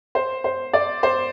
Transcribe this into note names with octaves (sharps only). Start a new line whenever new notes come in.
C5
C5
D5
C5